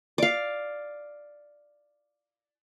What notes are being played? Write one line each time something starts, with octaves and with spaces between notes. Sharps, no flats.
D5 F5